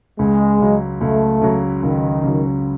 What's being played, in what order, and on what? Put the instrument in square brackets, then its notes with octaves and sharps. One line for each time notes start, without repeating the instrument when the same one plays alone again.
[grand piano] C#2 [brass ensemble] G#3
[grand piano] C#3 F#3
[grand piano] C#2 [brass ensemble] A3
[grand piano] C#3 F#3
[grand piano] C#2 [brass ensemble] D#3
[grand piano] C#3 F#3